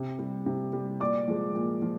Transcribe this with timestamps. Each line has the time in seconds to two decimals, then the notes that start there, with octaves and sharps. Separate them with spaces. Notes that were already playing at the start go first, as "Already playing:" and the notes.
Already playing: C3
0.19 G3
0.46 C3
0.73 G3
1.00 A#2 D5 D6
1.28 F3 G#3
1.55 A#2
1.82 F3